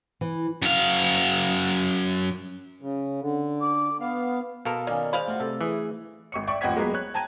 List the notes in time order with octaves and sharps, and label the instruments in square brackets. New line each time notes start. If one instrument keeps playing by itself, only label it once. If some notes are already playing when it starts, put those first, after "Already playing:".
[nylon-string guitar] E3
[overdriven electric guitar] F#2 F5
[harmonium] C#3
D3
[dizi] D6
[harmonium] B3 [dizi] F5
[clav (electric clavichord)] B2 A4 A#4 [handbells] F5
[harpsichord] D#3 C#4 [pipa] A#3 [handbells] D5
[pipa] G#3 F5 B5 [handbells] C5
[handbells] A3 [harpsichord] F4 F#4
[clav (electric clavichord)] C3 [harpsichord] A4
[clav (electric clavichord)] E3 [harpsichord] G#4
[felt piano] G#1 C#6 C#7
D5 E5 G5 C#6
A1 F2 F#5 G5 G#6 B6
F#3 G#3 A#3 B3
C#5 F#6
G5 A5 A#5 G#6 D#7